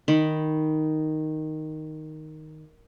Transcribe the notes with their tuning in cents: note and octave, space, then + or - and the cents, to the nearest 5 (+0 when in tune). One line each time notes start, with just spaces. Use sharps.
D#3 +0 B5 +0